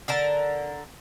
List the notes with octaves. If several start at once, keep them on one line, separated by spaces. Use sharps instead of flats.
D3 A#4 A5